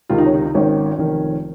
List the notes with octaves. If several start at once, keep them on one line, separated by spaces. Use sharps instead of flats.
C#2 C3 D#3 F4
D#4
C#4
D#4
D#4
G#1 G#2 D#3 C#4
F1 F2 D#3